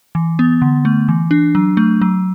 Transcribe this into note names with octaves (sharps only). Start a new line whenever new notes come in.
E3
B3
D3
A3
E3
D4
F#3
A3
F#3